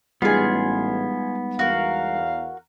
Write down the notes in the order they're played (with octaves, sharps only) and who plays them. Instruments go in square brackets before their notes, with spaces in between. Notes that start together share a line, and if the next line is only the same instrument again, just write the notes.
[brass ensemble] A1 [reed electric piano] G3 G#3 D#4 [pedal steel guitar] B3 [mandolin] F4 G#4
[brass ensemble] E2 F5 [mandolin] F#4 A#4